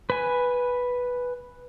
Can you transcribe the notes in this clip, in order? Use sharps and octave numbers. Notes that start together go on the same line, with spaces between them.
B4 G#5